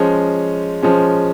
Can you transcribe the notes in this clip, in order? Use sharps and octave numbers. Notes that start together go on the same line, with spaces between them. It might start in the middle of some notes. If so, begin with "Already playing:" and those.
Already playing: F3 G#3 C#4
F3 G#3 C#4